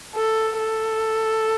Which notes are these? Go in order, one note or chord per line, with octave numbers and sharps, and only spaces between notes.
A4
A4